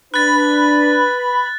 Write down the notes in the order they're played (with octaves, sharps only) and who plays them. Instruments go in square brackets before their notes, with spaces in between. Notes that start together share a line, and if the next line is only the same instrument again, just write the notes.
[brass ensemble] D4 [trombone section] B4 [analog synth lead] B5 [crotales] F#6 A6